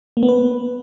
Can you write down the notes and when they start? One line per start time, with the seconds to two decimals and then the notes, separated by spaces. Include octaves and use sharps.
0.17 A#3
0.23 B3
0.29 B4